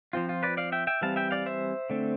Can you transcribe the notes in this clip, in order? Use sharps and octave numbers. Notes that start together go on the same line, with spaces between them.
F3 C4 F4
F4
B4 D5
D5 F5
E5 G5
E5 G5
E3 G3 C4 F5 A5
E5 G5
D5 F5
C5 E5
D3 A3 C4